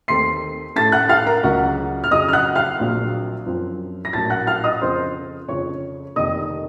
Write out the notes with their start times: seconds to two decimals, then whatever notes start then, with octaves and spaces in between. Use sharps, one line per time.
0.08 D#2 D#3 A3 C4 C6 C7
0.76 A2 A3 C#4 A5 A6
0.92 F#5 F#6
1.09 F5 F6
1.26 A#4 A#5
1.43 C#2 C#3 F#3 F#4 F#5
2.04 F6
2.11 F2 C#3 F#3 D#5 D#6
2.28 F6
2.33 F#5 F#6
2.55 F5 F6
2.79 A#1 A#2 F#3 C4
3.46 F#2 F3 C4
4.05 A#6
4.13 A#1 A2 F#3 A#3 C#4 A5 A6
4.30 F#5 F#6
4.47 F5 F6
4.64 D#5 D#6
4.81 F2 C#3 F3 C4 C5 C6
5.48 F2 C#3 F3 C#5 C#6
6.16 F1 F2 C3 D#3 A#3 D#5 D#6